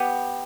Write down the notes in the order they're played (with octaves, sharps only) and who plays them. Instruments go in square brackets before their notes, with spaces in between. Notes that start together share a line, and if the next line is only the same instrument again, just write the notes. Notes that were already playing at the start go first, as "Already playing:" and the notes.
Already playing: [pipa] B3 G4